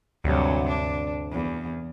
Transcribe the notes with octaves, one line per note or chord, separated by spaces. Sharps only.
D2 G2 C3 F#3
D4
E2